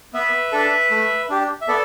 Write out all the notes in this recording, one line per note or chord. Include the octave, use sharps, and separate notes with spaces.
B3 B4 E5
D4 A4
A3
D4 G4
E5
B3 A4 D5